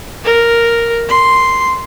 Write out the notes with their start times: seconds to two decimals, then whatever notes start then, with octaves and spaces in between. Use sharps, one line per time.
0.25 A#4
1.09 C6